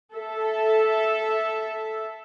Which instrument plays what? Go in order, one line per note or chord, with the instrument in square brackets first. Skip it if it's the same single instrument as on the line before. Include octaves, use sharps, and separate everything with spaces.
[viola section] A4 E5